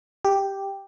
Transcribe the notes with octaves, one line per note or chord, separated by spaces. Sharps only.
G4